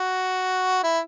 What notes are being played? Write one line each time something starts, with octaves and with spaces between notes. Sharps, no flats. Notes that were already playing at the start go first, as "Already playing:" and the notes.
Already playing: F#4
E4